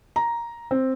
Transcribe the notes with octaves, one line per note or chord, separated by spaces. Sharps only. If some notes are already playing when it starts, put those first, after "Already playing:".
A#5
C4